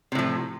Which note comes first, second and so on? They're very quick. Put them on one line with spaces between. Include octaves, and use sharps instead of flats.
C3 A2 F3